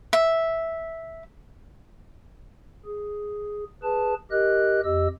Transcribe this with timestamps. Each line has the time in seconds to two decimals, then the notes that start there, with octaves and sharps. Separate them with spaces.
0.13 E5
2.85 G#4
3.83 G#4 B4 A5
4.31 G4 A#4 D#5 F#6
4.84 F2 G4 D#5 E6